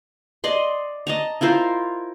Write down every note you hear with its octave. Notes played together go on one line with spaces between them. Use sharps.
D5 D#5 C6
D#5 A5 A#5
E4 F4 A#4 C5